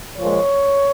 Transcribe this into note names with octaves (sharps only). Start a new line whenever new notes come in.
A#2 F3 G#3 C#5